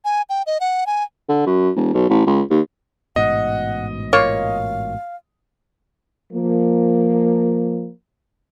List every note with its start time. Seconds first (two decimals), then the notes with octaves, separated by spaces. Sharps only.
0.05 G#5
0.30 G5
0.46 D#5
0.60 F#5
0.87 G#5
1.29 D3
1.46 F#2
1.76 E1
1.94 B1
2.10 A1
2.27 C#2
2.50 D#2
3.16 A1 G#2 B2 D#5 F#5
4.13 A#3 F4 C#5 F5
6.33 F3 A#3